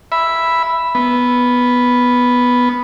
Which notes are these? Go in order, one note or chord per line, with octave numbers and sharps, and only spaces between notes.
E5 B5
B3